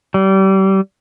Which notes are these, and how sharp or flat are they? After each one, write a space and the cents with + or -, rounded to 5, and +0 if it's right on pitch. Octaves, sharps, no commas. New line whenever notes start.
G3 -30